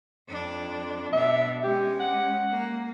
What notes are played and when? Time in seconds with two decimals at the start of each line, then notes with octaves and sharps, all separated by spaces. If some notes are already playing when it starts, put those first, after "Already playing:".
0.29 F2 D4
1.13 B2 D4 E5
1.64 G#3 C#4 G4
2.00 F#5
2.51 A#3